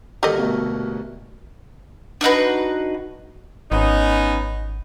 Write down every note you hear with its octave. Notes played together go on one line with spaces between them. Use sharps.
D2 G2 A#2 G4 A4 D#5
B2 A3 A#4
D4 D#4 F#4 B4
G#1 B3 C#4 D#4